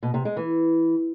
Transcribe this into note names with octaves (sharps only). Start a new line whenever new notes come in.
B2
C3
G#3
E3